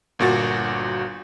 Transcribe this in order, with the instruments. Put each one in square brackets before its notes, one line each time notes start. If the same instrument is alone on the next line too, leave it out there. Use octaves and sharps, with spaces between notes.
[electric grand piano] G1 A#2 F#4 A6